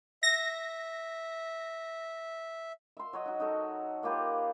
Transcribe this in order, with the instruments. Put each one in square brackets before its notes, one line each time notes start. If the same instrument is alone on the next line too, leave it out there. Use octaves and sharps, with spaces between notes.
[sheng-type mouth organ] E5 [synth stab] A#6
[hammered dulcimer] E5 C6
F#3 C#5 D#5
D#4 F#4
D#4 A4 C#5
A#3 F4 G4 B4